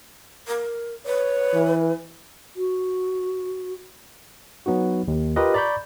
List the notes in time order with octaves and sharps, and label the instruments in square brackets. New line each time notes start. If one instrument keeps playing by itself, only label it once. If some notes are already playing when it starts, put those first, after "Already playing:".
[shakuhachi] A#4
[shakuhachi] B4 [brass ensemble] C#5
[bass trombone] E3
[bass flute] F#4
[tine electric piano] F#3 B3 D#4 F#4
D#2
F4 G4 A#4 B4 D#5
D5 A#5 B5 C#6 G6